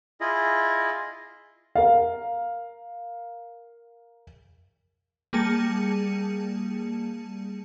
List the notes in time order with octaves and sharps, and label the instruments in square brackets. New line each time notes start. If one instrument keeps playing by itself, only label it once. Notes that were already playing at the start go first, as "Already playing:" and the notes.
[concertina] E4 F4 G#4 D#5
[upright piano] A#4 F5
[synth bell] G3 A#3 G#4 A5 C#7 D#7